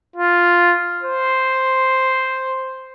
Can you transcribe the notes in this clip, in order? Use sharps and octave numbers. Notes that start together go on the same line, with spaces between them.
F4
C5